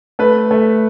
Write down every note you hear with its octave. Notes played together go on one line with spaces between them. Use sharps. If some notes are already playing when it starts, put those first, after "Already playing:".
A3 B4
A3